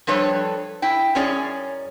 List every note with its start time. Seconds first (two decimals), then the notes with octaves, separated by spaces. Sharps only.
0.07 F3 G3 D4 A4 B4 C#5
0.82 E4 G5
1.15 F#2 C#4 G#4 C#5 D5